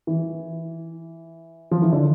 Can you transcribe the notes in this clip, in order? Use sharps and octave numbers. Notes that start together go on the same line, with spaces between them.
E3
F3
E3
D3